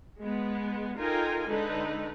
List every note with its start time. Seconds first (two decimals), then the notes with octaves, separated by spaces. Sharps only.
0.23 G#3 B3
0.98 D#4 F4 A4 A#4 G5 G#5
1.49 D3 G#3 D#4 A4 B4